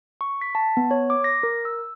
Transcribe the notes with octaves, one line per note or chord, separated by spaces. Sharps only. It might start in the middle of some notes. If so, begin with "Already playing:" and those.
C#6
B6
A5
B3
C#5
D6
A#6
A#4
E6